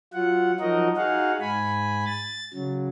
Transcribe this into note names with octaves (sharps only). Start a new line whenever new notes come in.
F#3 F4 F#5
F3 F#3 D#4 F#4 A#4 D#5
D#4 F#4 G#4 F5 F#5
G#2 G#5 B5
A6
C#3 F#3